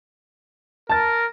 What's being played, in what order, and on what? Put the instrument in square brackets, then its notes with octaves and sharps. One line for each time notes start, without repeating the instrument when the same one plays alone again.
[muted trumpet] A#4 [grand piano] A5 A6